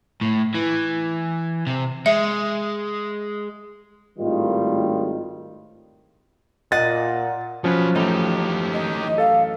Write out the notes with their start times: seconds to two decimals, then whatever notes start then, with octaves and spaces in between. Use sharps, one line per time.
0.21 A2
0.54 E3
1.67 C3
2.06 G#3 E5
4.19 G#1 A2 D#3 G3 F4
6.72 A#2 D#5 F#5 A6
7.64 F3 F#3 C#4 B4
7.95 F#2 A2 E3 D#4 G4
8.73 D#5
9.18 A4 F5